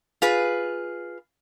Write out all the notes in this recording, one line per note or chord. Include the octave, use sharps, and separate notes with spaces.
F4 G#4 B4